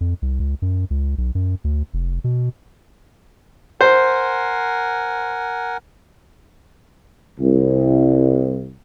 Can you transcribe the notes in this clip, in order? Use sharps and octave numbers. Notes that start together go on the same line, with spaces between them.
F2
C2
C#2
F#2
C#2
B1
F#2
D2
F1
B2
A#4 C5 F#5 G#5
C2